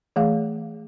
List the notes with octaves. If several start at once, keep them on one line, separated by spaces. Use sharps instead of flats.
E3 A3 G#4 F5